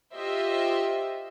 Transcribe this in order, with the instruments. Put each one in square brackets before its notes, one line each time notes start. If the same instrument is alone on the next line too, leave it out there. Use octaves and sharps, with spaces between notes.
[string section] F4 G4 C5 D#5 E5 G5